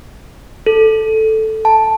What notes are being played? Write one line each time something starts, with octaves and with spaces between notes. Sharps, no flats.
A4
A5